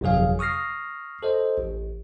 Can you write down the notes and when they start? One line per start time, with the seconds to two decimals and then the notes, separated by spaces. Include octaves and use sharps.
0.01 G1 F2 C3 F#3 G#4 F5
0.39 C#6 D#6 F6 A#6 C7
1.23 A4 C5 D#5
1.58 A1